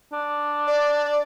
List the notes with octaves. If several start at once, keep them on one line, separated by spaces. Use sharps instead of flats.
D4
D5